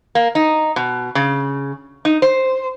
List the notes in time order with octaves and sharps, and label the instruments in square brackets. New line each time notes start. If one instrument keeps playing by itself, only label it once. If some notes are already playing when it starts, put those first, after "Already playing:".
[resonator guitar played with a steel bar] A#3
D#4
B2
C#3
D#4
C5